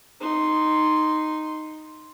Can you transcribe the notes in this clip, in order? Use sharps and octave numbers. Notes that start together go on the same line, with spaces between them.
D#4 C6